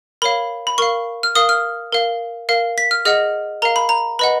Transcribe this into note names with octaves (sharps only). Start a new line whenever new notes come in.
A#4 C#5 F5 B5
B5
A#4 F5 C#6
F6
A#4 F5 D#6
F6
A#4 F5
A#4 F5
B6
F6
G#4 D#5 F#5 F6
A#4 F5 A#5
B5
A#5
B4 D#5 F#5 B5